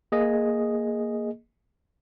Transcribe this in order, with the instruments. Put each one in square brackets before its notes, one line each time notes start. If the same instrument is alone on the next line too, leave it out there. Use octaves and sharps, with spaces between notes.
[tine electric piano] A#3 G#4 D#5